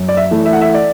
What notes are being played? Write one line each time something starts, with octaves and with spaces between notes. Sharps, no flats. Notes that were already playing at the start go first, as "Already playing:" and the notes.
Already playing: F#2
D5
E5
E3 A3
E5
F#5
E5
D5